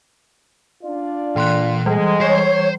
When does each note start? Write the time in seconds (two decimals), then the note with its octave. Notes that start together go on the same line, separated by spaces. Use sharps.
0.83 D4 F4 D5
1.36 A#2 E3 C6 F#6
1.86 E3 G3 G#3
2.21 C5 C#5 C6